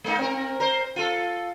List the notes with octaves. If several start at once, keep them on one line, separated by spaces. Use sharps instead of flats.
G#3 A#3 D#4
C4 A#4
A#4 C5
F4 A4